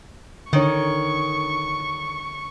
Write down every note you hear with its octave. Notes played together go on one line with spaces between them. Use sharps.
D3 D#3 C#5 C#6